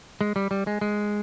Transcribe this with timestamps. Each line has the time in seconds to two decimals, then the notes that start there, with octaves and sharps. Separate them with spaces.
0.21 G#3
0.36 G3
0.51 G3
0.67 G#3
0.81 G#3